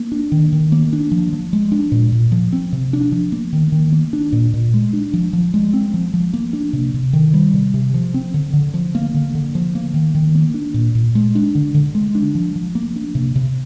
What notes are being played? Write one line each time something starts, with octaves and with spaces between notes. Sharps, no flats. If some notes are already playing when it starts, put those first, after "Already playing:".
Already playing: A#3
D4
D#3
D#3
A#3
D4
F3
F3
G#3
D4
A#2
A#2
F3
C4
C3
D4
F3
A#3
D#3
D#3
A#3
D4
A#2
A#2
G#3
D4
F3
F3
G#3
C4
F3
F3
A#3
D4
C3
C3
D#3
G3
C3
C3
F3
C4
D3
D3
F3
A#3
D3
D3
F3
A#3
D#3
D#3
A#3
D4
A#2
A#2
G#3
D4
D3
D3
G#3
D4
F3
F3
A#3
D4
C3
C3